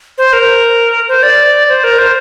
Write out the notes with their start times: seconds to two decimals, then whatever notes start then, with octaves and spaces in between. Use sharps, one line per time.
0.18 C5
0.33 A#4
1.08 C5
1.23 D5
1.68 C5
1.84 A#4
1.98 C5